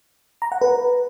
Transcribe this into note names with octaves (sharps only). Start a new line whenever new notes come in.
A#5
F#5
B4